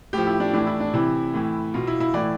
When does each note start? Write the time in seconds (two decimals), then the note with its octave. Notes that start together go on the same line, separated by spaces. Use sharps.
0.13 A2 F3 G4
0.27 E4
0.40 D4
0.53 A2 E3 D4
0.67 E4
0.80 D4
0.94 C3 E3 E4
1.34 A2 E3
1.74 B2 F4
1.87 E4
2.00 E4
2.14 A2 E3 D5